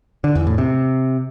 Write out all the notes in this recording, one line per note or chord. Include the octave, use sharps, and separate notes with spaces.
D3
E2
A2
C3